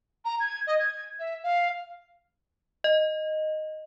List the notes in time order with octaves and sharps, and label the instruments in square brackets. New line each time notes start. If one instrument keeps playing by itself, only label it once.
[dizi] A#5
G#6
D#5
G#6
E5
F5
[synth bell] D#5